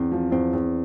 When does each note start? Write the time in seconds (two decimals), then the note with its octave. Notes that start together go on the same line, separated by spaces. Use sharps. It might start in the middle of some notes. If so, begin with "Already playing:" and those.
Already playing: E2 C4
0.12 F3
0.32 E2 C4
0.53 E2